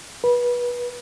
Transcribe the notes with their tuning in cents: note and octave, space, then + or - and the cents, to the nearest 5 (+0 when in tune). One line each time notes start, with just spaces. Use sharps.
B4 -25